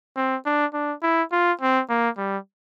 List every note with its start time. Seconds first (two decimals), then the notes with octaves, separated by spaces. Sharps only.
0.16 C4
0.46 D4
0.74 D4
1.03 E4
1.32 F4
1.61 C4
1.89 A#3
2.17 G3